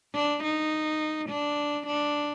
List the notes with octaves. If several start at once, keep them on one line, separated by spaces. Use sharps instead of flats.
D4
D#4
D4
D4